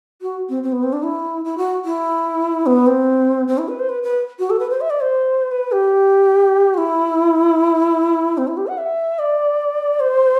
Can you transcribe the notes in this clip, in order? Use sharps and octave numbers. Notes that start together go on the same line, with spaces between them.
F#4
C4
C4
B3
C4
D4
E4
E4
F#4
E4
B3
C4
C4
E4
B4
C5
B4
B4
F#4
A4
B4
C5
E5
D5
C5
B4
G4
F#4
E4
C4
E4
G4
F#5
E5
D5
C5